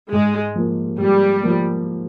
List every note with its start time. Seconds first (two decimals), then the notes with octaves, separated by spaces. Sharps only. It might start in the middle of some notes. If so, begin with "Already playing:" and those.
0.12 G#2 G#3
0.55 F3 A#3
0.99 G#2 G3
1.43 F3 A#3